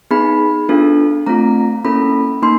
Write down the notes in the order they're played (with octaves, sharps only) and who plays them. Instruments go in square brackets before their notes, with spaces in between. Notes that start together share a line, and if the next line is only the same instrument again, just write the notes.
[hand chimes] B3 D#4 G#4 B5
B3 D4 F4 A4
A3 C4 F4 A#5
A#3 C#4 E4 A4 B5
A#3 D#4 C6